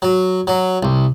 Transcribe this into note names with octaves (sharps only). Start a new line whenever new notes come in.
F#3
F#3
C2